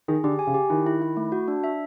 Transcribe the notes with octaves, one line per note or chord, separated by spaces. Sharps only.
D#3 G#4
D3 G4
G#5
C#3
G4
D#3 E4
E4
E4
A3
F#4
D4
E5